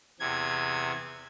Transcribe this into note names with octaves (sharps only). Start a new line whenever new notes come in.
E2 C3 G#6